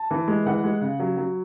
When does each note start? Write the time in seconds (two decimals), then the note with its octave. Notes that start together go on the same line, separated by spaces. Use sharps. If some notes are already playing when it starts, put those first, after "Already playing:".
Already playing: A5
0.11 E3
0.28 G#3
0.46 E3 F#5
0.64 G#3
0.81 C#3
1.00 F#3
1.17 F#3